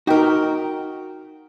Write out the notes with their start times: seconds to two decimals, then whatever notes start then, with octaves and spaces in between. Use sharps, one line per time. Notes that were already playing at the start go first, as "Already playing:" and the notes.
0.07 D#4 F#4 A#4 G5